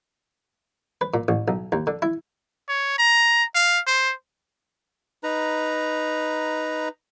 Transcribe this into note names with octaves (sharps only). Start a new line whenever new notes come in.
B4
A#2
A1
B1
D#2
D3
E4
C#5
A#5
F5
C5
D#4 B4 A#5